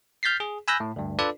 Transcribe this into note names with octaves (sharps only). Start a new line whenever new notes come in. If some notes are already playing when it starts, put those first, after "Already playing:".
F6 G6 A6 B6 C7
G#4
G#5 B5 E6 F#6 G6 A#6
A2
D2 G2
D4 F4 A4 B4 D5